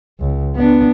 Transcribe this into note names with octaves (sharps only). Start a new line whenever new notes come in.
C#2
B3 D4